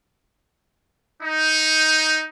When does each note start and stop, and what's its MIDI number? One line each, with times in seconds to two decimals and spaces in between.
1.22 2.26 63